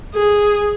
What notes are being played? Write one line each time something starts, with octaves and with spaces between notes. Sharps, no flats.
G#4